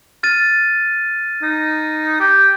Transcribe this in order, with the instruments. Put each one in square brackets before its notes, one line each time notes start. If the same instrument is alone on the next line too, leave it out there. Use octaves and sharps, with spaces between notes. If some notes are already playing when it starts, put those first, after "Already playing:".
[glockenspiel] F6 A6 D#7
[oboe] D#4
G4